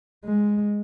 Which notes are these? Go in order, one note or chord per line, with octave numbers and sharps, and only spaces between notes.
G#3